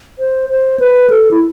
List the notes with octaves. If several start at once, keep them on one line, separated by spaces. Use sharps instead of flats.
C5
C5
B4
A4
E4